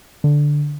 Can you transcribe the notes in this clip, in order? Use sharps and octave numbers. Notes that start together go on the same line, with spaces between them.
D3